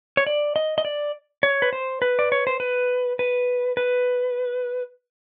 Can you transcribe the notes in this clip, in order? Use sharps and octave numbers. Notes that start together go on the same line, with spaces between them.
C#5
D5
D#5
D#5
D5
C#5
B4
C5
B4
D5
C#5
C5
B4
B4
B4